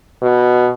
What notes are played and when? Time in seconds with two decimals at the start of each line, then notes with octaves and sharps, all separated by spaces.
0.22 B2